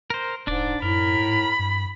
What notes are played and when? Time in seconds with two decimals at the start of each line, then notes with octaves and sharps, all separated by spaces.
0.10 A#4 C5
0.47 D#1 G#2 D4 D5
0.82 F#2 A2 A#4 B5
1.19 G#2
1.59 G2